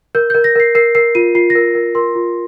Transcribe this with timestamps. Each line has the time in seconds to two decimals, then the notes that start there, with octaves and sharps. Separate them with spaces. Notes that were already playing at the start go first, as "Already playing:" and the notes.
0.15 A#4 G6
0.30 A#4 G6
0.44 A#6
0.55 A#4 C7
0.75 A#4 C7
0.95 A#4 C7
1.15 F4 D#7
1.35 F4 C7
1.50 A#6
1.55 A#4
1.75 A#4
1.95 A#4 C6
2.15 F4